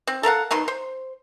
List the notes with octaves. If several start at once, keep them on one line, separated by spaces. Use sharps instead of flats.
C4
A4 A#4 F5 F#5
B2 D#3 F#3 C6
C5